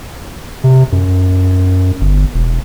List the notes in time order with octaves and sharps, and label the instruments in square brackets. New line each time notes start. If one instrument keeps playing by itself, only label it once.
[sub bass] C3
F#2
G1
E1